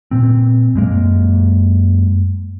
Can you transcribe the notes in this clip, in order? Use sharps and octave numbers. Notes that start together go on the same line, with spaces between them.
A#2 C4
F#2 G#3 A#3